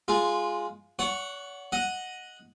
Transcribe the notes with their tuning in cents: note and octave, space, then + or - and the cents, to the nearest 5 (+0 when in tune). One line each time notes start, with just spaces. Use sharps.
G#3 +0 F4 +0
C#5 +45 F#5 +0 C#6 +0
D#5 +5 F#5 -5